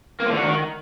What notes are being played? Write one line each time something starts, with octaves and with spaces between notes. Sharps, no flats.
A#3
F3
D3
F#4
D#3